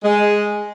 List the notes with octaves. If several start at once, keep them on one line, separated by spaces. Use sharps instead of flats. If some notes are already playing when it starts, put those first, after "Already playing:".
G#3